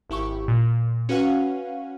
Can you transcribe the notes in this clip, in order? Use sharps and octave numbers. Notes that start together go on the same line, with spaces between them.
G#1 E4 G4 C#6
A#2
C#4 F#4 B4 F5 F#5